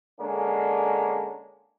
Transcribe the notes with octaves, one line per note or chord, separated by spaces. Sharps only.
D3 G#3 A#3 C#4 D4